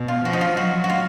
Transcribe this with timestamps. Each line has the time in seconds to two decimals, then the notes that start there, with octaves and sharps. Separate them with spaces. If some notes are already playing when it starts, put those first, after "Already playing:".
Already playing: B2
0.08 F4
0.25 F3 F#4
0.33 D#4
0.41 F4
0.57 F#3 F#4
0.84 F#4
0.90 F4